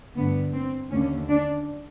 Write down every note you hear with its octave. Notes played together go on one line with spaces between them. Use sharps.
G2 D3 B3
C4
D#2 D3 C#4
D4